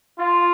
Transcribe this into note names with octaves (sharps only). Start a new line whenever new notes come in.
F4